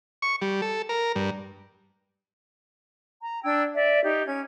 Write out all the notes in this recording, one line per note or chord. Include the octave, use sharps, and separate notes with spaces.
C#6
G3
A4
A#4
G2
A#5
D4 G5 E6 G#6
D5 E5
D#4 G4
C#4 G#6